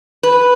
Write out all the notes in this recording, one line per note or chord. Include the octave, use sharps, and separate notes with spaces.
B4